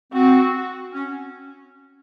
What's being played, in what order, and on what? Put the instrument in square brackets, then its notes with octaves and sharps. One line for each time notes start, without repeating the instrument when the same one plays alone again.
[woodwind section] C4 [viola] F#4
[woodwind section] C#4